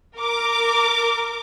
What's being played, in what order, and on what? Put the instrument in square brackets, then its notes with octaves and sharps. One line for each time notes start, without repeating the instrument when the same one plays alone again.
[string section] A#4 D6